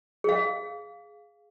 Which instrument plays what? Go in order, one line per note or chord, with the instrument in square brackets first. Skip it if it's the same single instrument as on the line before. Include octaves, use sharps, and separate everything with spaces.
[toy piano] G#4 F5